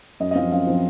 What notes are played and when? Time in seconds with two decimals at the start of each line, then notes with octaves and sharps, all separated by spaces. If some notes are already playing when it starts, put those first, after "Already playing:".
0.20 F#2 D#5
0.31 D#5
0.35 F3 C4 F5
0.52 F#2 F5
0.67 F3 C4